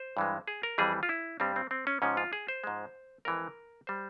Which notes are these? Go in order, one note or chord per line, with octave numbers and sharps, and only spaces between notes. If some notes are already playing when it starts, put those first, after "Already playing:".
Already playing: C5
G2 E3 G#3
G#4
A#4
F2 E3 G3 G#4
F4
E4
G2 G3 C4
C4
C4
C#4
G#2 F3 G#3 C#4
F4
G#4
C5
G#2 F3 G#3
F2 E3 G#3 A#4
G3 C5